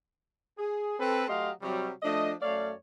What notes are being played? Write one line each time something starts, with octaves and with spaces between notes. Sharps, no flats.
G#4
C4 A4 B4
F#3 A3 G4 D#5 F5 C6
C3 F#3 G3
F3 A3 D4 D#5
F#2 A3 C#5 D5 F5